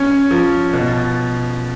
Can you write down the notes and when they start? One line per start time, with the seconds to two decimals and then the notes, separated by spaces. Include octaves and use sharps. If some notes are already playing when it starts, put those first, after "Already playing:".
Already playing: C#4
0.31 F3
0.73 B2